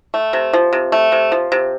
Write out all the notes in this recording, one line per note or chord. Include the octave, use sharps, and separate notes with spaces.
A3
C3
F3
C3
A3
C3
F3
C3